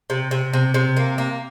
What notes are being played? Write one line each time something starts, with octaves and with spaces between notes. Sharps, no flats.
C3
C3
C3
C3
A#3
A#3